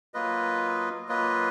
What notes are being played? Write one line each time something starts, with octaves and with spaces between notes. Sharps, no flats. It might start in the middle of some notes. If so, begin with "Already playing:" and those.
F#3 A#3 F4 B4 D#5
F#3 A#3 F4 B4 D#5